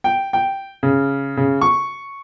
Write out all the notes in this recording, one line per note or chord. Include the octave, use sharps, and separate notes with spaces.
G5
G5
C#3
C#3
C#6